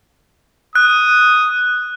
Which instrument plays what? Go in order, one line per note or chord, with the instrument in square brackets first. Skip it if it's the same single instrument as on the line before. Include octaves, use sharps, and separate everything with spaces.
[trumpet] D#6 [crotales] F#6